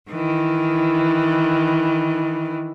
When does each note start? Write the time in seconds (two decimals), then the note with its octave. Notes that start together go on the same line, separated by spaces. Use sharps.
0.11 D#3 E3